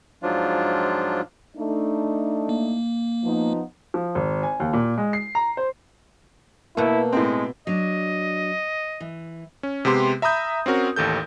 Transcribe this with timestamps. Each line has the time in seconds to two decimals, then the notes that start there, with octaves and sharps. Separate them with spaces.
0.23 G#2 F3 F#3 D4 F4
1.56 A3 D4 D#4
2.49 A#3
3.24 F3 B3 D#4
3.94 F3
4.15 G#1
4.43 G#5
4.60 D#2
4.73 A#2
4.98 G#3
5.13 C7
5.35 A#5
5.57 C5
6.77 B2 A3 A#3 E4
7.12 A2 G#3 C4
7.67 F#3 D4 D#5
9.00 E3
9.63 C#4
9.85 C3 G#3 B3 G4 C6
10.22 E5 A#5 B5 D#6 G6
10.66 C4 C#4 F#4 A#4
10.96 A1 D#2 A4 G6